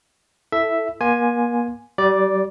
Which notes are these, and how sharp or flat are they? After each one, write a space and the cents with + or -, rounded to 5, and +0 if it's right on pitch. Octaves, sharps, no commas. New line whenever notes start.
E4 +0 A4 +0 E5 +0
A#3 +40 G#5 +0 C6 +5
G3 -35 D5 +0